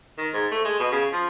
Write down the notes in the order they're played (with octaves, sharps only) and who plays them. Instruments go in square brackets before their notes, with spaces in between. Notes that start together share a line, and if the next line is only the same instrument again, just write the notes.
[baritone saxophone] D#3
G#2
A3
G#3
B2
C#3
F3